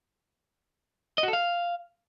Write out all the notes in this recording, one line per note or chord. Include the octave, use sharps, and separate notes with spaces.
D#5
F#4
A4
F5